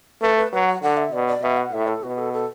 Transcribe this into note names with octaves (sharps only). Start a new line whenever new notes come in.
A3 B4
B4
F#3 B4
F#5
D3 F#5
E5
B2 D5
D5
B2 E5
F#5
A2 E5
A4
B2 F#4
A4
A4